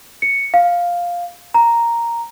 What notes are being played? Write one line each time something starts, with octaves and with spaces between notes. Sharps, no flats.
C#7
F5
A#5